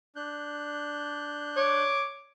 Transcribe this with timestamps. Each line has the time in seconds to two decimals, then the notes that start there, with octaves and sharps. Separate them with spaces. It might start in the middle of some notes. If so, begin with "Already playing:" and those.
0.16 D4 F#6 G6
1.57 C#5 D6